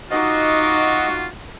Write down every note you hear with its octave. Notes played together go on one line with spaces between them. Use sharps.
D#4 F4 F#4 D#5 D6